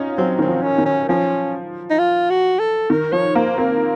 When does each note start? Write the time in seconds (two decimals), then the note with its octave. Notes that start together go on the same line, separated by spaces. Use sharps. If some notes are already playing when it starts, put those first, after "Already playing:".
Already playing: C#4 D#4 F4
0.17 F#3 C4
0.39 D#3 C4
0.48 F3
0.63 C#4
0.78 D#3
0.85 C#4
1.08 F3 C#4
1.90 D#4
1.99 F4
2.30 F#4
2.59 A4
2.90 D#3 A#4
3.12 F3 C#5
3.35 A#3 C5
3.58 C4 A#4